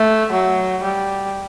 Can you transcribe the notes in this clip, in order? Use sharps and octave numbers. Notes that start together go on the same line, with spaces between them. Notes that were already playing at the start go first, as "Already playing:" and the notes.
Already playing: A3
F#3
G3